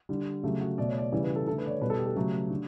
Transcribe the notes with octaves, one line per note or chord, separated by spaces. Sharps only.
D3 G3
C#3 F#3 A3 G4
F#4
B2 A3 D5
C#5
D5
C#3 E3 G3 D5
B4
A4
D3 A3 A4
B4
D5
C#5
B2 G3 B4
A4
G4
A4
C#3 F#3 A3 G4
D3